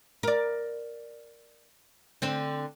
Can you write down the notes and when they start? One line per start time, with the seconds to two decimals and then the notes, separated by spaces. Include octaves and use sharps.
0.23 A#4 D5
2.22 D3 C4 C5